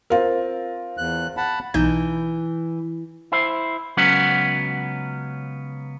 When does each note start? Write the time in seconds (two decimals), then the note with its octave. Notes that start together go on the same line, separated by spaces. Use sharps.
0.10 C4 F4 A#4
0.98 E2 F#6
1.37 F#5 A5 B5
1.74 B1 E3 D#4 G6
3.32 E4 C5
3.97 C#2 F#3 B3 C#4 F#5